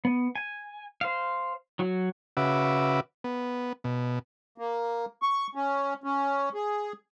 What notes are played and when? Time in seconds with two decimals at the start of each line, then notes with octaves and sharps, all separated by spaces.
0.05 B3
0.36 G#5
1.01 C5 F5
1.79 F#3 F#4
2.37 C#3 F#4 B4 E5 D6
3.24 B3
3.84 B2
4.58 A#3
5.22 C#6
5.55 C#4
6.04 C#4
6.54 G#4